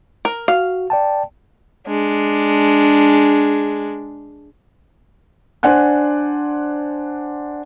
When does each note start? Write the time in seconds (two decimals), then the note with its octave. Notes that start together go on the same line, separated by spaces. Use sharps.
0.25 A#4
0.48 F#4 F5
0.90 D5 G5 A5
1.87 G#3 D4
5.63 D4 C5 D5 F#5 G#5 F#6